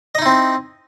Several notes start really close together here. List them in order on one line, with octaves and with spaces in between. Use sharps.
D#5 D#4 E4 C4